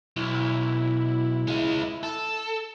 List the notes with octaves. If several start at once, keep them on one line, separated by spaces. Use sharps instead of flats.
B1 E4
G#3 F4
A4